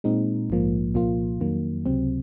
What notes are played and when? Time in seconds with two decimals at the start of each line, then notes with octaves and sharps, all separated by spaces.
0.04 A#2 G#3 C4 D#4
0.50 A#1 G#2 F3 A#3
0.94 C2 A#2 F3 A#3 F4
1.40 F2 D#3 F#3 A#3
1.86 C#2 C3 F#3 C4